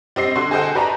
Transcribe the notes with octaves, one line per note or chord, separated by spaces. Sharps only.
G3 C4 D#5 C7
D3 F#4 C6
G#4 A4 C5 D#5 F#5 G5
F#4 B4 D5 G5 A5 A#5